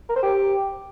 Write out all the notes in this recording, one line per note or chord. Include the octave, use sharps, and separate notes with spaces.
A#4
C5
G4